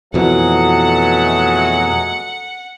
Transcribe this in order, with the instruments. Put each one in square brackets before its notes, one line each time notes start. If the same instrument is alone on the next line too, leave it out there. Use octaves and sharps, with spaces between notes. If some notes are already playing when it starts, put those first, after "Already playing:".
[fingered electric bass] F2 B2 E3 [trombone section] F#3 G#3 [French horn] A3 [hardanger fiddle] F#5